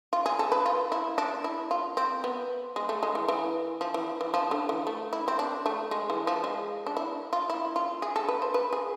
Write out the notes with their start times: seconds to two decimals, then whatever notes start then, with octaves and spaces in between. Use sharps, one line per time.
0.13 F4
0.26 G#4
0.39 A4
0.52 B4
0.66 F4
0.92 E4
1.18 D4
1.44 E4
1.71 F4
1.97 C4
2.24 B3
2.76 G#3
2.89 A3
3.03 G#3
3.15 E3
3.28 E3
3.81 F3
3.94 E3
4.21 E3
4.34 F3
4.51 D3
4.69 E3
4.87 A3
5.13 E4
5.28 C4
5.39 D4
5.66 A3
5.91 G#3
6.10 E3
6.27 F3
6.44 G#3
6.87 D4
6.97 E4
7.33 F4
7.50 E4
7.76 F4
8.02 G#4
8.16 A4
8.28 B4
8.42 C5
8.54 B4
8.73 G#4